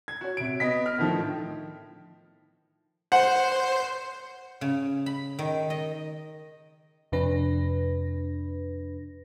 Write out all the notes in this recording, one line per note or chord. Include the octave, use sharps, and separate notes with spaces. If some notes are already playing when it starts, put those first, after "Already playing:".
G#6
F#4 C#5
C3 D7
B3 D#5 B6
F6
A2 D3 D#3 F3
C5 F#5
C#3
B5
D#3
D#5
F2 C3 D4 B4 A#6